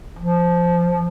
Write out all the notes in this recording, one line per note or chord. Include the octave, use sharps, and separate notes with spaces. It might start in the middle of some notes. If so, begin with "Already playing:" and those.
F3